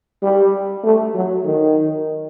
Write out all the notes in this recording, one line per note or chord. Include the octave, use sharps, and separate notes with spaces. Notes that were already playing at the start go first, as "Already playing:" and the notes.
G3
A3
F#3
D#3